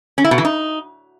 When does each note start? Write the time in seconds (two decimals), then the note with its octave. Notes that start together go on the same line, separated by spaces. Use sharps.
0.18 C#4
0.24 E4
0.31 B2
0.38 E3
0.45 D#4